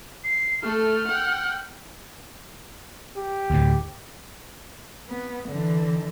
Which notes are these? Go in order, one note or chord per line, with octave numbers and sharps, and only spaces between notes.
C7
A3 A4 F6
F#5 G5
G4
D2 A2
B3
D3 E3